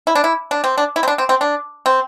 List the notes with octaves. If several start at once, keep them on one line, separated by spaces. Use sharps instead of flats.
E4
D4
E4
D4
C4
D4
E4
C4
D4
C4
C4
D4
C4